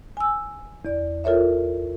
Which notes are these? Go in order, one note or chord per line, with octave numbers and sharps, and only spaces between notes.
G#5 E6
E2 D5
F4 A4 A#4 C#5 E5